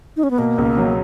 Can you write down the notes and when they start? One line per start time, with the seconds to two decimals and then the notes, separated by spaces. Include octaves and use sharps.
0.17 D#4
0.23 C#4
0.31 B3
0.38 B2 A#3
0.58 C#2
0.77 F#3